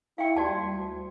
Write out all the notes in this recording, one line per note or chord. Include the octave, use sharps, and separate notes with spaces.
E4 F5 G5
D#2 F#4 D5 A5
G3
D2